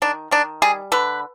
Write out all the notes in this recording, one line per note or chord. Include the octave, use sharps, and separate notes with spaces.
D#3 D4
D#3 D4
G3 G#4
D3 B4